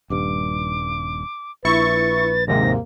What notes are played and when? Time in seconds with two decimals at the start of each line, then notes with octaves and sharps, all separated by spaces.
0.10 D#1 G2 D6
1.65 A#1 E4 B4 C#6 A6
2.48 D#2 G#2 C3 A#3 A#6